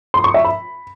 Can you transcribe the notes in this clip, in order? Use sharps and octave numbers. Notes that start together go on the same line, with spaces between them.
C6
C#6
E5
B5